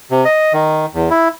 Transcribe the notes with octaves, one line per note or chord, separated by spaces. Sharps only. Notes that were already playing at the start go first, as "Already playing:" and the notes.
C3
D#5
D#3
E2
E4